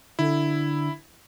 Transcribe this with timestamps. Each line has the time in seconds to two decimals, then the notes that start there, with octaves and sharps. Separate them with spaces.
0.19 D3 E4